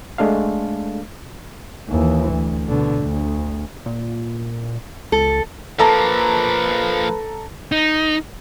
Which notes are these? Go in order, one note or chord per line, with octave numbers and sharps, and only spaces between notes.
G#3 A3 D4 A4 F5
D#2 E3
D2
B2 D3
D2
A#2
C#2 A4
F3 A#3 A4 B4 A5 A#5
D#4